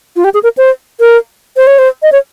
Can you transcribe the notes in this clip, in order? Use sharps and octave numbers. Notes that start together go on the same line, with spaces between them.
F4
G4
G#4
A#4
C5
A#4
C5
C#5
C5
D#5
C#5